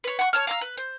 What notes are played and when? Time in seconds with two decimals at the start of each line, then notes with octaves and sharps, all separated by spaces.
0.04 B4 C#5
0.19 F#5 C#6
0.33 C#5 A5 F6
0.47 F5 A#5 E6
0.61 B4
0.77 C5